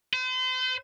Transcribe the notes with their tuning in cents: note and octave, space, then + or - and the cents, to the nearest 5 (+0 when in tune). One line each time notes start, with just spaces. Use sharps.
C5 -40